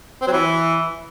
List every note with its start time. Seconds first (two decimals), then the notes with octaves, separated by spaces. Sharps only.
0.22 C4
0.27 F#3
0.33 E3